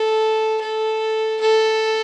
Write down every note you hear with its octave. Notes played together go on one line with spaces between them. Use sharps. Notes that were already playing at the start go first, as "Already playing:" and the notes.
Already playing: A4
A4
A4